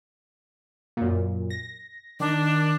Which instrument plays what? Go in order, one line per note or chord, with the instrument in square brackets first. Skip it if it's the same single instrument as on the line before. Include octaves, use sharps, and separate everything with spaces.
[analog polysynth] F#2 A#2
A#6
[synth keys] D#3 [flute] D4